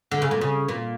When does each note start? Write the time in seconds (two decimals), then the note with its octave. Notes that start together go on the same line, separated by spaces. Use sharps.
0.11 D3
0.22 C#3
0.31 A#2
0.41 C#3
0.69 A#2